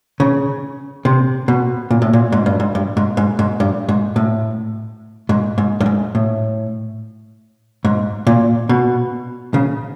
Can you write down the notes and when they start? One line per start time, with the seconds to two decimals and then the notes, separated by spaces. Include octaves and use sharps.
0.20 C#3
1.05 C3
1.48 B2
1.91 A#2
2.02 A2
2.13 A#2
2.32 G#2
2.46 G2
2.60 G#2
2.75 G2
2.97 G#2
3.17 G#2
3.39 G#2
3.60 G2
3.89 G#2
4.16 A2
5.29 G#2
5.58 G#2
5.81 G2
5.86 G#2
6.15 A2
7.85 G#2
8.27 A#2
8.69 B2
9.54 C#3